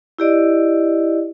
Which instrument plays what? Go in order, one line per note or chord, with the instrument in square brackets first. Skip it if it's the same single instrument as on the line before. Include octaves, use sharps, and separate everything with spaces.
[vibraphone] E4 G4 D5 D#5